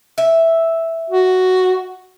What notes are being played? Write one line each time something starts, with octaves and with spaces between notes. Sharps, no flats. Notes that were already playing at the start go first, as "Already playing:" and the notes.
E5
F#4